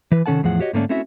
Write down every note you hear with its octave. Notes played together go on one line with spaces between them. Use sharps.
E3 B4
C3 D#3 C#4 A4 F#5 A5
E2 A2 F3 G#4 F#5
F#4 G4 C#5 D#5
G#2 D3 A3 A#3 C#4 D4
A3 C4 C#4 E4 F#4 E5